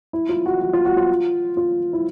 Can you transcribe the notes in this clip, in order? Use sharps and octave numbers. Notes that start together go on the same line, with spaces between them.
E4
F4
F#4
F#4
F4
F#4
F4
F4
E4